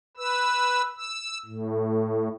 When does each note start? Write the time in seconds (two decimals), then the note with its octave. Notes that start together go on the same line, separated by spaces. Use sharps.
0.17 B4 E6
0.97 E6
1.46 A2